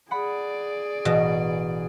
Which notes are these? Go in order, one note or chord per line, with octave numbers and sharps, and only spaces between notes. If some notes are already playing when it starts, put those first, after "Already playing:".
G#4 D5 F#5 B5
A1 B2 E3